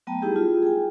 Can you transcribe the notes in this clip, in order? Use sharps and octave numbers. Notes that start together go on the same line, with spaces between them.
F#3 A3 B3 G5 A5 A#5
G3 B3 D#4 E4 G4 G#4
F4 G#4
G#4 G5 G#5